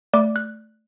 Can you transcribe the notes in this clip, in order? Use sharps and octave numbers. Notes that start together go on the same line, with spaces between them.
A3 D5 D6
F#6